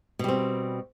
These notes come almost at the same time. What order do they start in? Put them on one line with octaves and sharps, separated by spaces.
B2 G3 C4